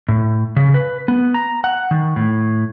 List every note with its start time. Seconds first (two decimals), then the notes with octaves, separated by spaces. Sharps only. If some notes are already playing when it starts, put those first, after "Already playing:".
0.09 A2
0.56 C#3
0.74 B4
1.08 B3
1.34 A#5
1.64 F#5
1.91 D#3
2.16 A2